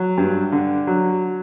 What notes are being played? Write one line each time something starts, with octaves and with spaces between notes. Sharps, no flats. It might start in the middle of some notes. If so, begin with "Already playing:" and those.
Already playing: F#3
G2
D3
F#3